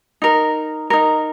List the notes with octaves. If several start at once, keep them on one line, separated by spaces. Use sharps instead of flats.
D#4 A#4
D#4 A#4